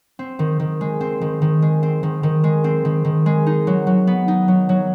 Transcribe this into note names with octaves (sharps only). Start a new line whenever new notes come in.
C4
D#3
D#3
G#3
C4
D#3
D#3
G#3
C4
D#3
D#3
G#3
C4
D#3
D#3
G#3
D#4
F#3
F#3
B3
D#4
F#3
F#3